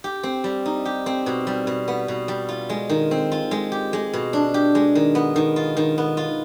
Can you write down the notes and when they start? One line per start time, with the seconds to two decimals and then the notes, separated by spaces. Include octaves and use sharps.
0.04 G4
0.23 C4
0.44 G3
0.66 D#4
0.85 G4
1.06 C4
1.26 B2
1.47 G3
1.67 B2
1.88 B3
2.08 B2
2.28 G3
2.49 F4
2.70 G#3
2.90 D#3
3.11 C4
3.32 F4
3.51 G#3
3.72 G4
3.93 G#3
4.13 B2
4.33 D4
4.54 G4
4.75 G#3
4.95 D#3
5.15 B3
5.36 D#3
5.56 F4
5.77 D#3
5.98 B3
6.17 F4